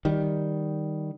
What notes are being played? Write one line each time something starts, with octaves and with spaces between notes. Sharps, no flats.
D#3 G3